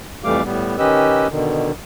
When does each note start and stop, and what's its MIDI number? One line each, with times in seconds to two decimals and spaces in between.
0.24 0.43 41
0.24 0.43 52
0.24 0.43 55
0.24 0.43 57
0.24 0.43 77
0.24 0.43 86
0.44 0.76 45
0.44 0.76 55
0.44 0.76 59
0.78 1.27 51
0.78 1.27 61
0.78 1.27 67
0.78 1.27 71
0.78 1.27 75
0.78 1.27 88
1.30 1.72 47
1.30 1.72 50
1.30 1.72 51